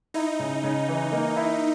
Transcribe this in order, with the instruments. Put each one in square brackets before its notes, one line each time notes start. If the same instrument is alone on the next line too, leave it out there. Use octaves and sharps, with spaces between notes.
[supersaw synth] D#4 [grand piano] E4
[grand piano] C#3
C#3
E3
A#3
E4